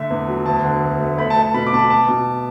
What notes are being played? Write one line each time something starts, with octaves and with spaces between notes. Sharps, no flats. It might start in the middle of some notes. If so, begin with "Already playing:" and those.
Already playing: D3 A3 E5
E2
F#3
D2 A5
D3
D2
A3
A3 B5
A5
A3
A5
B2 B5
D6
B2 A5
B5
B3 A5
B2